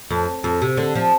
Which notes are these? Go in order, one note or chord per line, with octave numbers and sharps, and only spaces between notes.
F2
F2
C3
D3
F3